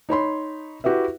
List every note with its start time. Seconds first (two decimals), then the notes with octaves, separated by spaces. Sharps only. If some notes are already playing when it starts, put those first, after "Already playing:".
0.09 D#4 C#5 B5 C6
0.84 E4 F#4 G4 B4 E5